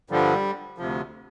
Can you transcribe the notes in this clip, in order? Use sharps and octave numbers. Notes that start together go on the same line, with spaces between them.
G2 D3 F3 G3
D2 C3 F3